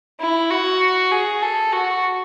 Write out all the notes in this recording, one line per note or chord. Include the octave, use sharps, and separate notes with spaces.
E4
F#4
G#4
A4
F#4